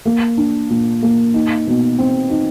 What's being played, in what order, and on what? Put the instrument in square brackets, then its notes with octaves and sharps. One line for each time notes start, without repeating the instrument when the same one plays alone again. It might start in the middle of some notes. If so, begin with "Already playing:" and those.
[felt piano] A#3
D4
A#2
A#3
D#4
B2
C4
D#4